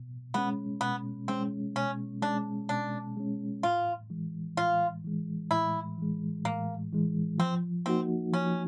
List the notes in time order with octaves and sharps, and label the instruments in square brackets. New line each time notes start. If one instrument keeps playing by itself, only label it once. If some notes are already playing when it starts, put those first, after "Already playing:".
Already playing: [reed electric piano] B2
[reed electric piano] G#3 C#4 [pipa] B3
[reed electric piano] B2 [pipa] B3
[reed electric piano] G#3 C#4 [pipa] C4
[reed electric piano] B2 [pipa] C#4
[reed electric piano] G#3 C#4 [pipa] D4
[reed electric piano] B2 [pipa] D4
[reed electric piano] G#3 C#4
[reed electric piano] A2 [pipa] F4
[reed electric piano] E3 G#3
[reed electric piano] A2 [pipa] F4
[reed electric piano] E3 G#3
[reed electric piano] A2 [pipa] E4
[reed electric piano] E3 G#3
[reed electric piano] A2 [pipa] A#3
[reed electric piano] E3 G#3
[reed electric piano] F3 [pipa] C4
[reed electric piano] A#3 D#4 F#4 [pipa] C4
[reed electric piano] F3 [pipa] C#4